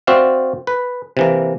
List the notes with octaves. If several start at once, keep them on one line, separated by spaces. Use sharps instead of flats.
C4 F#4 C5 D5 E5 F5
B4
C3 E3 A#3